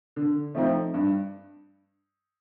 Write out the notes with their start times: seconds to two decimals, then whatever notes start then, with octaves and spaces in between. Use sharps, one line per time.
0.16 D3
0.55 F3 A3 C4 D#4
0.94 G2